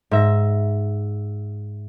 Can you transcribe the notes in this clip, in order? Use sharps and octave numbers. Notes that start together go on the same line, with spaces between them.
G#2 E5 A#6